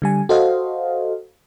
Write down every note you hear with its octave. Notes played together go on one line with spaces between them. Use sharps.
D3 G3 G#5
F#4 A4 C5 D#5 F5